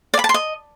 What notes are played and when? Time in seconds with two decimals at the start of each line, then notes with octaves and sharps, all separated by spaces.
0.14 D5
0.19 B5
0.24 A5
0.29 C6
0.34 D#5